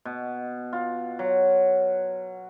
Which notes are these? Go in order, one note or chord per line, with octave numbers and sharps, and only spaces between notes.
B2
F4
F#3